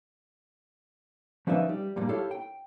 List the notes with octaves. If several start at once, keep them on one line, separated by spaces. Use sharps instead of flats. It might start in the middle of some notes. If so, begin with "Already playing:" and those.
F3 C#4 D#4 B4 D5 E5
G3
G2 A#2 G3
E4 G4 A4 C#5 F5
G5